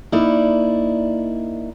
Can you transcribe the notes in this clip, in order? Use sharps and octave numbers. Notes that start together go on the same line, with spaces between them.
A#3 D#4 E4 D5